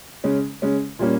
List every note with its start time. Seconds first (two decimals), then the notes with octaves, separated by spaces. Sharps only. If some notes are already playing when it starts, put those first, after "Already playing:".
0.24 C#3 G#3 C#4
0.62 C#3 G#3 C#4
0.99 A#2 G3 A#3 C#4